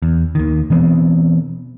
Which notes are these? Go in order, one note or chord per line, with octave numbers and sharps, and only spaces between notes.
E2
D#2 D#3
B2 E3 B3 C4